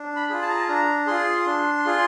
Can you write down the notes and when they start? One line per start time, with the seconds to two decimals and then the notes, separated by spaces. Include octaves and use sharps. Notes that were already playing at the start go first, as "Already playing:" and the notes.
Already playing: D4
0.16 B5
0.30 F4 G#4
0.42 A5
0.49 A#5
0.57 A5
0.68 D4 A#5
1.07 F4 G#4 C6
1.46 D4
1.85 F4 G#4